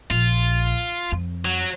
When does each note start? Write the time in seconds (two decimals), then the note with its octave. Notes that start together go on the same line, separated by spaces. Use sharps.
0.11 A#1 F4
1.12 F2
1.45 F#3